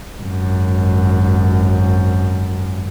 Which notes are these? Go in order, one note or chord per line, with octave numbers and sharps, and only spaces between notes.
G#1 F#2